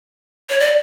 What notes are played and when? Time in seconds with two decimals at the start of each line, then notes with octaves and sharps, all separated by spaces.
0.50 C#5
0.60 D5